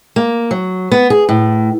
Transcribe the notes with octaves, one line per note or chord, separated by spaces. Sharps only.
A#3
F#3
B3
G#4
A2